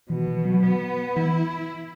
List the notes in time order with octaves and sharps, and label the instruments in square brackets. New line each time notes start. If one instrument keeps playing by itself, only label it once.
[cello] B2 [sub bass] E3
[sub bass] E3
F#3
[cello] B3
[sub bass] E3 [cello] E4